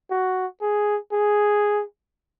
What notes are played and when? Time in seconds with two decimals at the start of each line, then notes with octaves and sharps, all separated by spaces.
0.10 F#4
0.61 G#4
1.12 G#4